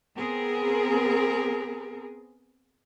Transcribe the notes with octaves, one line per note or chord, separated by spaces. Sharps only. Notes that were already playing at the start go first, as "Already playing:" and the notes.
B3 C4 G#4 A#4